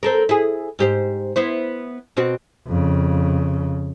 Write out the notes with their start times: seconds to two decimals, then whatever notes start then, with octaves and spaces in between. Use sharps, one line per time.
0.03 C4 A4 A#4
0.29 E4 G#4
0.79 G#2 G4 C5
1.36 B3 E4 C5
2.17 B2 C4 F#4
2.67 F2 C#3